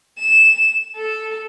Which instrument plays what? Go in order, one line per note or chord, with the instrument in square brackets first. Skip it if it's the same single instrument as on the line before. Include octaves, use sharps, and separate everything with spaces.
[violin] E7
A4